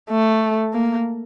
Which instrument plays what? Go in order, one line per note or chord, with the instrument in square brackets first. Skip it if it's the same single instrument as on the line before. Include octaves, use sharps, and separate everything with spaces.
[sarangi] A3
A#3